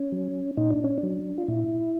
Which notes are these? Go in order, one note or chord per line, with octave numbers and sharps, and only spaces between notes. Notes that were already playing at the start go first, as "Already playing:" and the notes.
Already playing: C#4
F#3
A#2 D#4
D4
C#4
D4
F#3
F4
A#2 E4